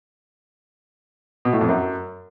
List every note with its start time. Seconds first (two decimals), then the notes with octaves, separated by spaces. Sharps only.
1.45 B2
1.53 A2
1.61 F2
1.69 F#2